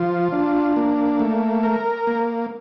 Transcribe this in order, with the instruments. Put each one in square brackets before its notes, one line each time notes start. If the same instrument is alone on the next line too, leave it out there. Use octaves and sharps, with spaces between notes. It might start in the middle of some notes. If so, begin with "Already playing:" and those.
Already playing: [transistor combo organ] F3 F4
D4
A#3
A3
A#4
A#3